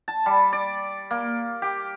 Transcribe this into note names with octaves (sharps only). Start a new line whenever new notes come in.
A5
G3
D5
A#3
G4